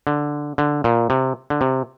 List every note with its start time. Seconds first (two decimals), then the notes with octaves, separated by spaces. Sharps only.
0.07 D3
0.58 D3
0.84 A#2
1.10 C3
1.50 D3
1.61 C3